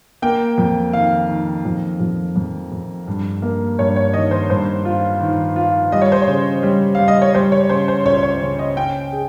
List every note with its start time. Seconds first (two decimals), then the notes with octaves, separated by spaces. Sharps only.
0.22 A#3 G5
0.58 F2
0.93 D#3 F5
1.29 D#3
1.65 F2
2.00 F2
2.36 F2
2.72 F2
3.07 G2
3.42 A#3
3.79 G2 C#5
3.96 C#5
4.14 D#3 D#5
4.31 C5
4.50 G2 C5
4.85 F4
5.21 D#3
5.56 F4
5.92 G3 D#5
6.02 C#5
6.12 C5
6.22 C#5
6.27 C#3
6.63 G3
6.95 G3 F5
7.08 D#5
7.22 C#5
7.34 G3 C5
7.52 C#5
7.70 C#3 C5
7.88 C5
8.05 C#2 C#5
8.23 C#5
8.41 C#3
8.59 D#5
8.76 C#4 G5
9.13 G#4